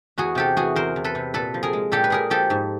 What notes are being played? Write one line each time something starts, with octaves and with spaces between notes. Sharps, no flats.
E2 F#4 G#4
C3 G4 A4
E3 F#4 G#4
E2 A#4 C5
E2
A4 B4
C3
A#2 A4 B4
F3
G#4 A#4
G#3
A#2 G4 A4
B4
A#2 G#4 A#4
F3 G4 A4
G#2